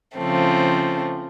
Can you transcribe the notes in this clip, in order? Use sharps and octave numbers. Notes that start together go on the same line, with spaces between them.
C#3 F3 A3 C4